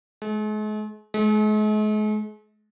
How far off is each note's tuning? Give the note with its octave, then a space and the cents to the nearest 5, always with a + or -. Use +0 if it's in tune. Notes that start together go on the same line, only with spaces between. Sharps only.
G#3 +45
G#3 +45